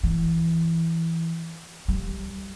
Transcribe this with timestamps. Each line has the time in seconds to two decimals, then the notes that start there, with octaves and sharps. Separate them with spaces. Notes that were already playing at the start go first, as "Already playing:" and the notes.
0.03 E3
1.88 G3